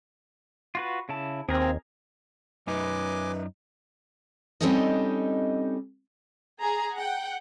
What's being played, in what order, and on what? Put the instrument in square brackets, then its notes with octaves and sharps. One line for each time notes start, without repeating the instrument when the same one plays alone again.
[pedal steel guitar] F4 F#4 B4
C#3 E4 A5
[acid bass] D#2 [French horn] C4 [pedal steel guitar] G#4 A#4
[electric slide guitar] F#2 D#4 [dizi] B4 [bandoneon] D#5 G#5 D6
[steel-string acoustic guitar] G3 C4 C#4 D#4 A4 D#5
[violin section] G#4 A#5
F#5 G5